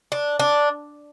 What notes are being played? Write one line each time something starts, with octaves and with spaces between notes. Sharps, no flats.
D4
D4